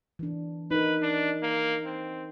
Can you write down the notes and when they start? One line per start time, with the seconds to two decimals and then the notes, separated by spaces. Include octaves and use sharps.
0.19 E3 D4
0.71 D#4 A#4 B4
1.02 D4
1.43 A#3
1.86 C4